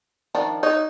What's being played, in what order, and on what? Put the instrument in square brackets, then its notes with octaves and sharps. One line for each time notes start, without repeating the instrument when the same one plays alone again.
[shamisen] D#3 F3 D4
[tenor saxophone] D#4 [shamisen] C#5